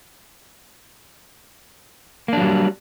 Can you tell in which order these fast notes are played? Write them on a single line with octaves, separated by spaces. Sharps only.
A#3 D4 F#3 G3